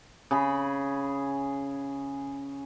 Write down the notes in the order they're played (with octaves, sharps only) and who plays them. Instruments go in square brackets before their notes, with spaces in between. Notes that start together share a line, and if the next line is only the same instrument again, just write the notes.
[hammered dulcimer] C#3 G#4 B5